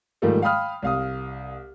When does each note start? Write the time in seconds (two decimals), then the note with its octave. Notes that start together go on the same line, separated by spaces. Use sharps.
0.22 G#2 D#3 F3 G3 A3 A#3
0.42 F5 G5 B5 D#6 F6
0.82 C2 F5 D#6